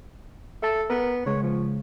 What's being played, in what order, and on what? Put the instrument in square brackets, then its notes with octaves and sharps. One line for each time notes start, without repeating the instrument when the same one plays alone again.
[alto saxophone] A4 [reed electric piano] E5 A5
[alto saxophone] B3 [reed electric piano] A#4
[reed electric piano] C#3 G#3 [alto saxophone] C#5
[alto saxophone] F3